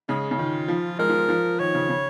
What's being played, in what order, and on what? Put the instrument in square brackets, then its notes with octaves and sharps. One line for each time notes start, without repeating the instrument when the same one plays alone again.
[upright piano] C#3 [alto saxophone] G#3
[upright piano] C#3
[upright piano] D#3 [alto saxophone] F4
[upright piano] F3
[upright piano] G#3 [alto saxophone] A#4
[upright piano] F3
F3
[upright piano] D#3 [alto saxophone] C#5
[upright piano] C#3
C#3